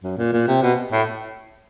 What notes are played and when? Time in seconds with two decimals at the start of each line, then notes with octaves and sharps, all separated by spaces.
0.03 F#2
0.18 A#2
0.33 A#2
0.48 C3
0.63 B2
0.92 A2